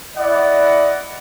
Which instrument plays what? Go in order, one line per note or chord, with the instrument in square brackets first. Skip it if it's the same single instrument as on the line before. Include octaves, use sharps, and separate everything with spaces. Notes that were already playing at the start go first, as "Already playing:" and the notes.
[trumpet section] E4 D5 D#5 F#5